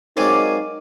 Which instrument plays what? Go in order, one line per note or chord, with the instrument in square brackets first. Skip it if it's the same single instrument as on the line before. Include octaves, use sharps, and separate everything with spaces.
[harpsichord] F#3 G#3 C4 [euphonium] D#4 [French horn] A#4 [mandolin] D5 F5 G#5